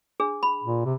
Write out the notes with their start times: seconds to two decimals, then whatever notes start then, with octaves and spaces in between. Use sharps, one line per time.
0.20 D4 G#4
0.43 B5
0.63 A#2
0.85 C3